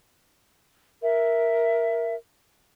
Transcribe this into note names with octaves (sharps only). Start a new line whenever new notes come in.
A#4 E5